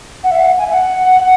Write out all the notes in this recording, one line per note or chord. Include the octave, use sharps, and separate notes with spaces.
F#5
E5
F#5
G#5
E5
F#5